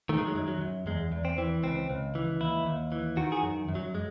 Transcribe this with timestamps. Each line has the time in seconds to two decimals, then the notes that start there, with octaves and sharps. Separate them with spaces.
0.09 D#3 A3
0.18 G#3
0.27 F#3
0.35 F#2 G#3
0.48 F#3
0.61 F#2
0.87 E2 G#3
1.12 E2
1.25 C4
1.38 E3
1.63 C#2 C4
1.90 C#2
2.15 E3
2.41 D#2 E4
2.66 D#2
2.92 E3
3.17 D#3 F#4
3.32 G#4
3.37 F#4
3.43 F#2
3.69 F#2
3.75 F#3
3.95 G#3